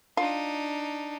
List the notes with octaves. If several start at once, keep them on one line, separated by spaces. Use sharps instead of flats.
D4 D#4 F4